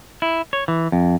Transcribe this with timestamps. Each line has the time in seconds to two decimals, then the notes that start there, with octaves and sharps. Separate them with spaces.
0.22 E4
0.53 C#5
0.68 E3
0.92 F2